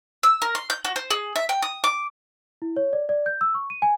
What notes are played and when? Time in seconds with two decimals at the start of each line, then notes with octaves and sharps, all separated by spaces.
0.23 E6
0.42 A#4
0.55 C6
0.70 G6
0.85 F#4
0.96 C5
1.10 G#4
1.36 E5
1.49 G5
1.62 D#6
1.84 D6
2.62 E4
2.77 C#5
2.93 D5
3.09 D5
3.26 G6
3.41 E6
3.54 C#6
3.70 D#7
3.82 G#5